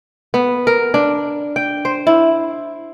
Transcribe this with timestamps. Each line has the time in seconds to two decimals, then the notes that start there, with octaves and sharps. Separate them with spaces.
0.34 B3
0.67 A#4
0.94 D4
1.56 G5
1.85 C5
2.07 E4